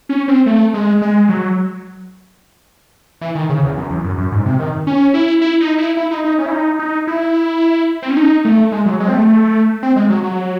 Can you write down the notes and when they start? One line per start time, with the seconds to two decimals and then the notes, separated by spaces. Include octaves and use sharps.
0.09 C#4
0.28 C4
0.46 A3
0.74 G#3
1.02 G#3
1.29 F#3
3.21 E3
3.35 D#3
3.49 C#3
3.63 E2
3.77 F#2
3.90 E2
4.04 F#2
4.18 F#2
4.32 G#2
4.46 C3
4.59 D#3
4.87 C#4
5.14 E4
5.41 E4
5.61 D#4
5.78 E4
5.97 E4
6.11 D#4
6.24 D#4
6.38 C#4
6.46 E4
6.52 D#4
6.79 D#4
7.07 E4
8.02 C4
8.10 C#4
8.17 D#4
8.45 A3
8.72 G#3
8.86 F#3
9.00 G#3
9.08 C4
9.14 A3
9.83 C4
9.96 G#3
10.10 F#3
10.23 F#3